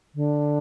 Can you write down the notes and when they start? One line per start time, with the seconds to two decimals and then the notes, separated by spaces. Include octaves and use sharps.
0.15 D3